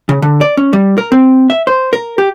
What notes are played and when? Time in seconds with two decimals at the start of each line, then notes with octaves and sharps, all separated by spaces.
0.09 C#3
0.22 D3
0.41 D5
0.57 C#4
0.73 G3
0.98 A#4
1.12 C4
1.50 E5
1.67 C5
1.93 A#4
2.18 G4